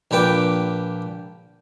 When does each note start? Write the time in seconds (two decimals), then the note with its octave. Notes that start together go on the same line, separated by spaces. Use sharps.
0.11 A#1 A#2 B4 G5 D6